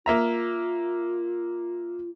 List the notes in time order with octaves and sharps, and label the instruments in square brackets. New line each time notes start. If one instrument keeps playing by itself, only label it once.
[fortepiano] A#3 E5 A#5 [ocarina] F4